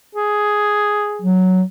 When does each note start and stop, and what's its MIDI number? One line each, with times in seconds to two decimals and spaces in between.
0.15 1.28 68
1.22 1.62 54